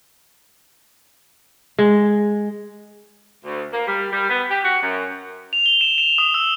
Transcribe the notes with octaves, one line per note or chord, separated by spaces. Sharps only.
G#3
D2
A#3
G3
G3
B3
G4
F#4
F#2
F7
G7
E7
E7
D#6
E6